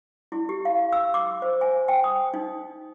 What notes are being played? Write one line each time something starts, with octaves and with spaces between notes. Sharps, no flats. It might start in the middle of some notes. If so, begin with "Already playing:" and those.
E4
G4
F5
E6
D6
C5
G#5
G5
D#6
D#4